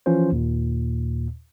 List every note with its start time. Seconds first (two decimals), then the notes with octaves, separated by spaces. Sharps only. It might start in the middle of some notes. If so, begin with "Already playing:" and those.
0.06 E3 F3 C#4 F4 C5
0.32 D#2 A#2